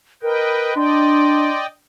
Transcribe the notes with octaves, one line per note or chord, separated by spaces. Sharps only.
A#4 B4 D#5 G5
D4 D5 D#5 G5 C6